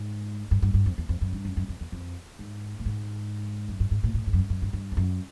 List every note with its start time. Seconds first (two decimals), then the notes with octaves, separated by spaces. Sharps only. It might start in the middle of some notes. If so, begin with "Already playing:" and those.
Already playing: G#2
0.51 G2
0.62 G2
0.74 G2
0.86 F2
0.98 E2
1.09 F2
1.21 F#2
1.33 G2
1.45 F#2
1.57 F#2
1.69 F2
1.81 E2
1.92 F2
2.39 G#2
2.79 A2
2.86 G#2
3.68 F#2
3.80 G2
3.91 G#2
4.04 A2
4.14 A2
4.27 G#2
4.33 F#2
4.39 G2
4.50 F#2
4.62 G2
4.73 G2
4.92 F2
4.97 F#2